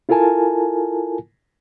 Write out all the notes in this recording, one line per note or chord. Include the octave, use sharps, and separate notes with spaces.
E4 F4 A4 A#4 G#5 A5